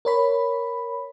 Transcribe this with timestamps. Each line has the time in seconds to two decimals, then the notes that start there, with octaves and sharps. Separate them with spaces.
0.05 A#4 C#5 B5